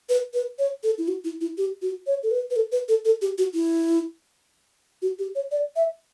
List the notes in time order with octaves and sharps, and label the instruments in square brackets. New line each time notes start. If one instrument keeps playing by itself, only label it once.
[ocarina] B4
B4
C#5
A4
E4
F#4
E4
E4
G4
F#4
C#5
A4
B4
B4
A4
B4
A4
A4
G4
F#4
E4
F#4
G4
C#5
D5
E5